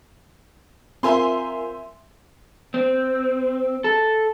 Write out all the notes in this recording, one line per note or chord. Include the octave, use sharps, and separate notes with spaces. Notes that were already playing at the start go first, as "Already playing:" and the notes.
C4 F4 A#4 E5 G#5 C6
C4
A4